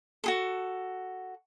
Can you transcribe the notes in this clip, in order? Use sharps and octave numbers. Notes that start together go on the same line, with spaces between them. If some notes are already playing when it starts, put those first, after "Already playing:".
F#4 G#4 A4